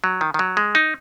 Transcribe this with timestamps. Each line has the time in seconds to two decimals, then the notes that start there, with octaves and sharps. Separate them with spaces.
0.04 F#3
0.21 D#3
0.34 D#3
0.39 F#3
0.57 G#3
0.75 D#4